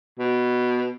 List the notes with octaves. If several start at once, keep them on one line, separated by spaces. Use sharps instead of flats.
B2